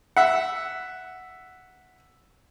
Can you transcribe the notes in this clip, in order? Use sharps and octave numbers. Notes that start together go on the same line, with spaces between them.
E5 F#5